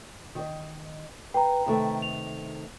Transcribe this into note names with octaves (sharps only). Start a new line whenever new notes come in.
D#3 D#5
B4 G5 A#5
C3 D#3 A3
F7